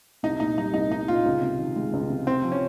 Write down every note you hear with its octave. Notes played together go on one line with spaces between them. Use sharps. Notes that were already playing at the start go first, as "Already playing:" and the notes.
C2 D#4
A#2 D#4
G3 D#4
C2 D#4
C2 D#4
A#2 F4
C#2
C3
D#3
G#3
C#2
C3
C3 C4
F3
C#4